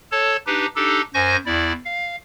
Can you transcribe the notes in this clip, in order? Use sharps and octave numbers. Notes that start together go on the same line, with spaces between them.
A4 C#5 A5
D4 D#4 G4 B4
D4 D#4 G4 A4
F#2 C5 G#5 C#6 G6 A#6
E2 E4 D5
F5